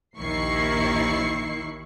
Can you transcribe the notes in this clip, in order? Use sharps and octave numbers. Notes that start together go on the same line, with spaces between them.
A#1 D#2 D#3 E4 C#6 C7